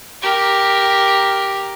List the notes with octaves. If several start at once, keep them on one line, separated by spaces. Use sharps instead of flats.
G4 A#4